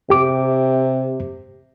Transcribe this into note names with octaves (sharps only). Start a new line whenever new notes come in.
C3 G4 D6